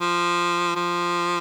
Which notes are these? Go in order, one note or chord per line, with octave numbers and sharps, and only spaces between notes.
F3
F3